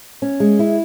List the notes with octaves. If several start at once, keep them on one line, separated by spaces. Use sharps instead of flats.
C#4
G#3
E4